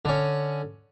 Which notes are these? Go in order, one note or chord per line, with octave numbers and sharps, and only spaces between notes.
D3 C#4